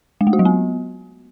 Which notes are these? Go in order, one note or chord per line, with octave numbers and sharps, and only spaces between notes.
G#3
A3
F#4
F#3
B3